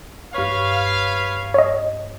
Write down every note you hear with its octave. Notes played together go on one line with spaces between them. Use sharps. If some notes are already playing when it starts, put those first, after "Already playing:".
G2 B4 C#5 F5 C#6
C#5 D#5